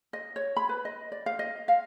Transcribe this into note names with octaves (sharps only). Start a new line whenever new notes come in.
D#5
C#5
B5
B4
D#5
D5
F5
D#5
F5